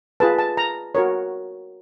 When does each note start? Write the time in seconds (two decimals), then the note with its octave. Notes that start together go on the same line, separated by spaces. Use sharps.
0.20 F4 G#4 B4 A5
0.39 A5
0.57 A#5
0.95 F#4 A#4 C#5